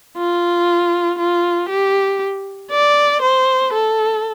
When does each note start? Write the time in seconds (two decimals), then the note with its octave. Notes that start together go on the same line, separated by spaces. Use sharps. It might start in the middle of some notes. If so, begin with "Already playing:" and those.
0.18 F4
1.19 F4
1.69 G4
2.71 D5
3.22 C5
3.73 A4